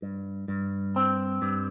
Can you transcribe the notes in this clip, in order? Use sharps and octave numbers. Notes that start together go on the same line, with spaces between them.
G2
G2
C4
G2